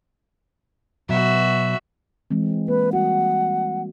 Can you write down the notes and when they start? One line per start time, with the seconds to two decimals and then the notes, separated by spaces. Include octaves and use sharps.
1.09 B2 F#3 F#4 E5
2.31 E3 G#3 C4
2.68 A#3 B4
2.93 G3 F#4 F#5